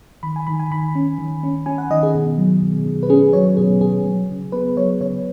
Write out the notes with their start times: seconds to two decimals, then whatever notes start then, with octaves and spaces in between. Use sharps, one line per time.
0.23 D#3 B5
0.36 G#5
0.47 D#3 B5
0.59 G#5
0.71 D#3 B5
0.95 C#4
1.18 D#3
1.43 C#4
1.66 C#4 G#5
1.78 F#5
1.90 D#3 D#5
2.03 G#4
2.15 B2
2.38 F#3
2.62 B2
2.86 B2
3.03 B4
3.09 C#4 G#4
3.33 F#3 C#5
3.57 B2 G#4
3.81 B2 G#4
4.06 F#3
4.30 C#3
4.52 B3 B4
4.77 F#3 C#5
5.00 C#3 C#5